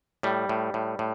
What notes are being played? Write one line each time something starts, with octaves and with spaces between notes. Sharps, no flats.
A2 G3
A2
A2
A2